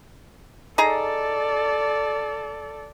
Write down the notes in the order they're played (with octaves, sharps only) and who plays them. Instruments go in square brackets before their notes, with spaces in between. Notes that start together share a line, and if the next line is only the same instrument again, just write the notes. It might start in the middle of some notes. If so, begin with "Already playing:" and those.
[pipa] D#4 G#4 A#5 [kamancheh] A4 D5